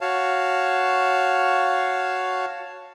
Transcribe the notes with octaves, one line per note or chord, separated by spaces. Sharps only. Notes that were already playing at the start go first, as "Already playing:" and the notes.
F#4 C#5 F5 A5